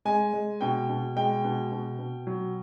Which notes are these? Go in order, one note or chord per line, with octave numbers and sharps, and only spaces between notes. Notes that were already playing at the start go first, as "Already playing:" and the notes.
G#3 G#5
G#3
B2 G5
B2
G#3 G5
B2
B2
B2
F#3